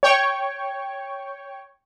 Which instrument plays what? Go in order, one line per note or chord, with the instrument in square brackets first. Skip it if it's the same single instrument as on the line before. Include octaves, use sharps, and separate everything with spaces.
[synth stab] C#5 G5 C#6